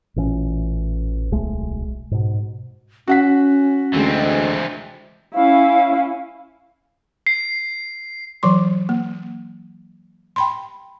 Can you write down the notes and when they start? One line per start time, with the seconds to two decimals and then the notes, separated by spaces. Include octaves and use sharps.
0.16 A1 A#2 E3 C#4
1.31 D1 B1 G#3 A3
2.11 G#2 B2
3.08 C#4 F#4 F#5 B6
3.94 D2 E3 G#3 C4
5.34 C#4 E4 F5
7.27 C7
8.43 E3 F#3 C6
8.89 A#3
10.36 G5 B5 C6